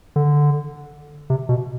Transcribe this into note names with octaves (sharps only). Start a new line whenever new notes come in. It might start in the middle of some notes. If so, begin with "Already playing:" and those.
D3
C3
B2